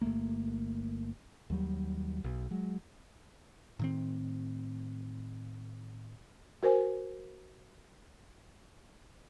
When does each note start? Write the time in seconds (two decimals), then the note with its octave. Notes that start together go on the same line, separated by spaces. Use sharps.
0.01 G1 F#2 A3 A#3
1.50 D#2 F#3 G3
2.24 B1
2.51 F#3 G#3
3.79 A2 D#3 C4
6.63 F#4 A#4 C5 G#5